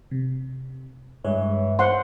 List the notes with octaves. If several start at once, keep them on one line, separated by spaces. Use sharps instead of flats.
C3
G2 E3 G#3 C#5
C5 F#5 C6